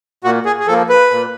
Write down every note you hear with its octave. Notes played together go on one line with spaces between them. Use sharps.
A#2 F#4
G#4
G#4
F3 A#3 A4
B4
A#2